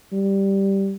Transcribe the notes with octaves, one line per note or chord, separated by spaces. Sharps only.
G3